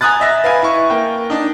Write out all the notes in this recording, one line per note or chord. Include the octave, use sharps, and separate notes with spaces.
G#5 A#5 D#6 F#6 A6
D#5 E5 A#6
B4 F5 G#5
E4 C#6
A#3 G5
D4 D#4